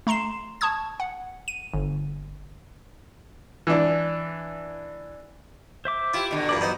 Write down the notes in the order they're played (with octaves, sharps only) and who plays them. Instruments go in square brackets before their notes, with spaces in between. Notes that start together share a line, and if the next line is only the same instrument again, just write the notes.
[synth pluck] A3 A#5 C6 C7 E7
A5 C#6 D#6 G#6
F#5
D#7
G1
[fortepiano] E3 D4
[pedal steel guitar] C5 E5 D6
[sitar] E4 [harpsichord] F4 G4
[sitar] B2 D3
[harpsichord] G2 A#2 E3 [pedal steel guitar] D5
[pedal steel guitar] F#3 [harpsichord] B3 D#4 C5